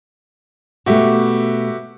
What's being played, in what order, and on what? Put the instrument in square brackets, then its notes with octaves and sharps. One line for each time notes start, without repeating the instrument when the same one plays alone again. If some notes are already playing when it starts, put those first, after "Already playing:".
[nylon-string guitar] B2 A3 [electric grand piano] F#4 G4 E5